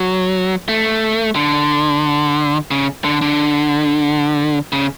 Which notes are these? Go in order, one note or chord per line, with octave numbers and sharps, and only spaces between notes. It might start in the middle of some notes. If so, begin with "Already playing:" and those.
Already playing: F#3
A3
D3
C#3
D3
D3
C#3